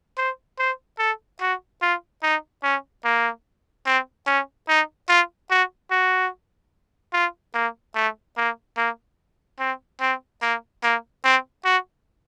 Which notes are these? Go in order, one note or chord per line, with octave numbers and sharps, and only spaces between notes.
C5
C5
A4
F#4
F4
D#4
C#4
A#3
C4
C#4
D#4
F4
F#4
F#4
F4
A#3
A3
A#3
A#3
C4
C4
A#3
A#3
C4
F#4